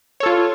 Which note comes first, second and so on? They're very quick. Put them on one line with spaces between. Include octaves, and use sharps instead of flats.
C#5 A4 F4